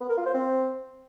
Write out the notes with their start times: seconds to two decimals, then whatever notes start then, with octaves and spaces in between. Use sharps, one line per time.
0.01 B3
0.09 A#4
0.17 F4
0.26 C5
0.34 C4